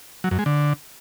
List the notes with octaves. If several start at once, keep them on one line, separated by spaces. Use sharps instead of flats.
F#3
F#2
G#3
D3